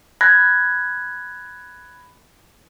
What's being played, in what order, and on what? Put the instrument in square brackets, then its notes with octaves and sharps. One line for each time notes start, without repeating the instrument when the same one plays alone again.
[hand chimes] B5 F#6 G#6 A#6